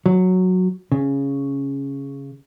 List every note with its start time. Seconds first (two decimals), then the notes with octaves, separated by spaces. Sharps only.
0.06 F#3
0.92 C#3